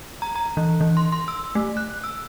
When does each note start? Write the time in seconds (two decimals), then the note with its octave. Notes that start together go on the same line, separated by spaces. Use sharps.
0.22 A#5
0.36 A#5
0.57 E3
0.81 E3
0.97 C6
1.12 C6
1.28 E6
1.55 A3
1.77 F#6
2.04 E6